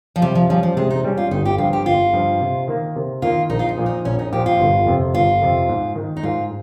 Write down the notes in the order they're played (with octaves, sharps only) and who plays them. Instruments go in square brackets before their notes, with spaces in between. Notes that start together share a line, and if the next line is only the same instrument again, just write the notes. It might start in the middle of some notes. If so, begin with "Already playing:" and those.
[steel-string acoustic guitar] F3
[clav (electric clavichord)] C3 [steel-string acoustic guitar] G3
[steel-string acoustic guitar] F3
[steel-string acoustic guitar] F3 [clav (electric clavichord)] G3 C#4
[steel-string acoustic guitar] F3
[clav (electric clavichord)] C3 [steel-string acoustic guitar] G#3
[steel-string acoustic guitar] D#4
[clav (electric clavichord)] G3 C#4
[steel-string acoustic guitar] F4
[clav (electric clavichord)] G1 [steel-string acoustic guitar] D#4
[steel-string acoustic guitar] G4
[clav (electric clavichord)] G2 F3 [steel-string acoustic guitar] F4
[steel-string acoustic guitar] G4
[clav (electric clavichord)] G1 [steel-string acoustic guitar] F4
[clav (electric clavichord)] G2 F3
C3
D#3 A#3
C3
[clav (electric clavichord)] D#3 A#3 [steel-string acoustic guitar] F4
[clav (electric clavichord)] A#1 [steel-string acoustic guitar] D#4
[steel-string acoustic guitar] F4
D#4
[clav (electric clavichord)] A#2 F3
[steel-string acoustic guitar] D#4
[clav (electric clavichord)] A#1 [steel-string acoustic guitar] C#4
[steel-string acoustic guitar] D#4
[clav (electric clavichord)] A#2 F3 [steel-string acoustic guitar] G4
[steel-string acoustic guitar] F4
[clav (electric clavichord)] G1
F2 C3
[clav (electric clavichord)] G1 [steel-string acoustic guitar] F4
[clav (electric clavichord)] F2 C3
G#2
D#3 G#3
[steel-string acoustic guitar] D#4
[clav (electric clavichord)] G#2 [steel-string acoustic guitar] F4